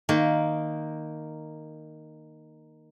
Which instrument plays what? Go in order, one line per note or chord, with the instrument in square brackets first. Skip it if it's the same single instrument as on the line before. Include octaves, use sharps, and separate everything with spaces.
[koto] D#3 A#3